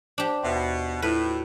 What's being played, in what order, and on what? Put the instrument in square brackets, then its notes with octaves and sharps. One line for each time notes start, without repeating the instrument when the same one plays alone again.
[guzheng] D4 G4 [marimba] C5
[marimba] D#2 E5 C6 [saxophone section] B2
[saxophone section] A2 [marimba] E4 F4 [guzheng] B4
[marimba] F#4